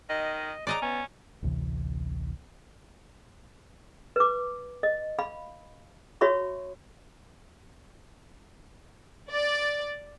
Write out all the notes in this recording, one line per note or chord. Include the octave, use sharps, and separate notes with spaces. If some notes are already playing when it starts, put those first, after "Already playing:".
D#3 D#5
C#3 D5 D#5 A#5 D6
B3 C#4
A1 D2 C3 E3
B4 D6
D#5
F5 B5
F#4 C#5 E5 B5 C#6
D5